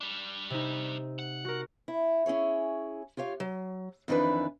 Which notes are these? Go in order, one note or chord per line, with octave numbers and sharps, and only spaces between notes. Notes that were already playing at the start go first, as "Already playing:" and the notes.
G3 D4
C3 D#4
F#5
F#4 A#4
E4
C#4 E4 G#4 C#5
F4 G4 C#5 F5
F#3
F2 D#3 E3 D4 B4